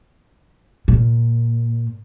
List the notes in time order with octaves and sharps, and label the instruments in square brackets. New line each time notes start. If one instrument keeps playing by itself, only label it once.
[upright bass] A#2